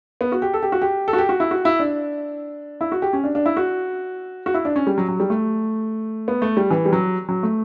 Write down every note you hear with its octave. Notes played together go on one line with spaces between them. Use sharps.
B3
F#4
G4
A4
G4
F#4
G4
A4
F#4
G4
F#4
E4
F#4
E4
D4
E4
F#4
G4
C#4
D4
D4
E4
F#4
F#4
E4
D4
C#4
G3
F#3
F#3
G3
A3
B3
A3
G3
E3
G3
F#3
F#3
A3